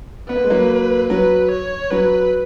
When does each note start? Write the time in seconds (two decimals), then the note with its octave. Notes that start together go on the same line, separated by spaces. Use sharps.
0.28 B3 B4
0.36 A#3
0.44 G#3
0.50 F#3 A#3
1.10 F#3 B4
1.51 C#5
1.91 F#3 B4